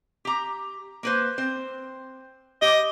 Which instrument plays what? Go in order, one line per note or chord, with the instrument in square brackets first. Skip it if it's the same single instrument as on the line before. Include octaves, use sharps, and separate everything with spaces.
[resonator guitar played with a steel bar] G4 A#5
A#3 B4 C5
C4 C5
[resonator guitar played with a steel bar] G4 [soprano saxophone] D#5